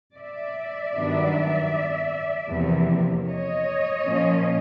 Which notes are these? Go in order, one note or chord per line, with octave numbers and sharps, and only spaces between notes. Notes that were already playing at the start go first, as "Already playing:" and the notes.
D5 E5
G2 D#3 F#3 B3 D4
E2 C3 F3 A#3
C#5 D#5
A#2 F3 A#3 C#4